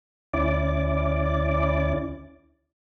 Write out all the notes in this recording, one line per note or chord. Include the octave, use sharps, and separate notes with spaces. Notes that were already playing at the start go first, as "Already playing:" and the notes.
D2 C#4 E4 D5 D6